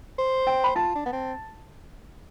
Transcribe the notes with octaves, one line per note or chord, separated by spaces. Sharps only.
C5
G5
B5
F4 A5
D4
B3
C4